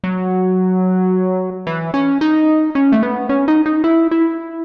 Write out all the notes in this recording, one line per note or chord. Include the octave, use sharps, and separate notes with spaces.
F#3
E3
C#4
D#4
C#4
A3
B3
C#4
D#4
D#4
E4
E4